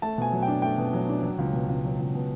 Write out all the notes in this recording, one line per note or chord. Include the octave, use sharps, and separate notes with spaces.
A3 A5
B2 G#5
F#3
G5
D4
A3 G5
B2
F#3
D4
F#3
C#2
B2
C#2
F#3
C#2
B2